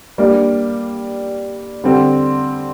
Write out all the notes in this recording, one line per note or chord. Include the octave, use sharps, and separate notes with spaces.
G3 A#3 D4
D3 G3 C4